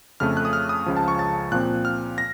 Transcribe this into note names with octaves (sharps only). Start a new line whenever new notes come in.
F2 C#3 A3 F6
F#6
D#6
F6
D#6
C#2 C#3 F3
A5
C#6
A6
A#2 F3 C4 F#6
F6
A#6